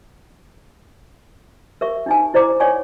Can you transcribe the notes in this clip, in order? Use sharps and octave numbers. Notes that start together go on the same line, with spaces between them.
A#4 E5 C#6
D4 D#4 G#5
E4 C5 D5 A#5 D6
A4 C#5 D5 F#5 G#5 C#6